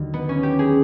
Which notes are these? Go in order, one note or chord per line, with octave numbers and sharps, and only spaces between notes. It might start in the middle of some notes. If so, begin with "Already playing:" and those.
Already playing: D#2 D3 F#3
B3
C#4
G4
G#4